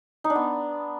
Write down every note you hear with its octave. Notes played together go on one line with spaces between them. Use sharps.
D#4
D4
B3